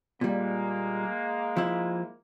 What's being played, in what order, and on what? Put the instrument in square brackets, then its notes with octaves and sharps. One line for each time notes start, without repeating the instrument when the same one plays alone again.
[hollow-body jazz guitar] A#2 G3 [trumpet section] G#3 A#3
[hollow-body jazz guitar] F3 E4